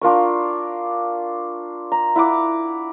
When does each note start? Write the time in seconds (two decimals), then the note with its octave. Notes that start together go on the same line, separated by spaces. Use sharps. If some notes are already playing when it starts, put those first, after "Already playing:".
0.01 D4 F4 A#4 C#6
1.92 A#5
2.16 E4 F#5 D6